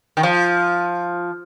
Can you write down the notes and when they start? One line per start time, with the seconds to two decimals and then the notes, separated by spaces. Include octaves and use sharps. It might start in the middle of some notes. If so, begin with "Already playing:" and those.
0.17 D#3
0.23 F3